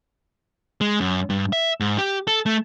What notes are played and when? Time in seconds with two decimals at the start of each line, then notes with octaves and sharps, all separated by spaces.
0.81 G#3
1.00 F#2
1.30 G2
1.53 E5
1.80 G#2
1.98 G4
2.27 A4
2.46 A3